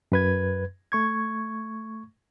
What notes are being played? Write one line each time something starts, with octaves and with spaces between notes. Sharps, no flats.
F#2 B4 G#6
A3 C#6 G#6